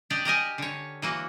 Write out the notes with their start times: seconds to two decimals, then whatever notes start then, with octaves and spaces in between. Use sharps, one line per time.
0.10 D4 G4 D5 D#5
0.25 G4 A#4 D#5 G#5
0.58 D3 C#5
1.02 E3 A#3 F#4